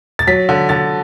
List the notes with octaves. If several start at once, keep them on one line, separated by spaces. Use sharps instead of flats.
A6
F#3 B6
D3
D3 A6